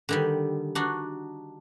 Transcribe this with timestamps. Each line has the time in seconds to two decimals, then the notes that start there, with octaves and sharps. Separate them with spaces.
0.09 D3 D#3 G3
0.75 D4 D#4 F#4